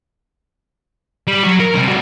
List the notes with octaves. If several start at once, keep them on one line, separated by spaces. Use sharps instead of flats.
G3
F#3 F#4
A#4
C3 G3
G3 F#4